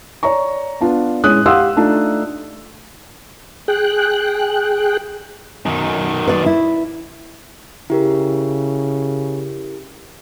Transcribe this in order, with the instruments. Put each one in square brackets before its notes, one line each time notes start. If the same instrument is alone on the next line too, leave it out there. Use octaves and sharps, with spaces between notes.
[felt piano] C#5 D5 A#5 C#6
B3 D4 F4
A2 G#3 C#4 D#6 F#6
G4 F5 F#5 C6 D#6 E6
A3 D4 D#4 F4
[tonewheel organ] G#4 G5 F#6
[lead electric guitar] F#2 D#3
[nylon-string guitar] B4 D5
E4
[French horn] C#3 [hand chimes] E4 G4 A#4